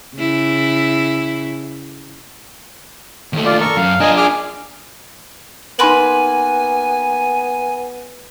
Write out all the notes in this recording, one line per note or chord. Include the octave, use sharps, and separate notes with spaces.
C#3 E4
D#2 A3
F4 D5
A4 A#4 C#6
F#2 F5
D4 F4 A#4 D#5 G#5
G#4 D6 F6
A#3 B3 D#4 B4 G#5 C6 F#7